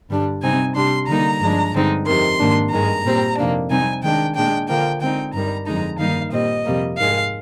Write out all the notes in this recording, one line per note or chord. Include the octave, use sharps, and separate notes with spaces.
G2 D3 G3 D4
C3 G3 C4 D#4 G#5
C3 G3 D4 C6
D3 G3 A#3 D#4 A#5
G2 F3 G#3 D4
G2 D3 G#3 C4 D#4
F2 C3 D#3 C6
G#2 D#3 A#3 D4
G2 D#3 G#3 A#5
A#2 G3 C4
F2 C3 D#3 A#3 D4
C3 G3 C4 D#4 G#5
D#3 G#3 D4 G5
A#2 G#3 D4 G5
D3 F3 A#3 G5
D3 G#3 C4 D#4 G5
G2 D#3 G3 A#5
F2 D3 G#3 D#4 A#5
G2 D#3 G3 A#3 D#4 F5
A#2 G3 C4 D#5
F2 C3 G3 A#3
G#2 D#3 G#3 F5